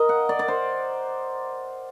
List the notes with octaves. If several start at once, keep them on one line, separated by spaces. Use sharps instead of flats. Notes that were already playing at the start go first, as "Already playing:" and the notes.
Already playing: A#4 D#5
F#5
D5
D5
C5